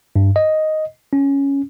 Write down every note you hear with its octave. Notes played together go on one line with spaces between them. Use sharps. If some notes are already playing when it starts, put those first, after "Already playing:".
G2
D#5
C#4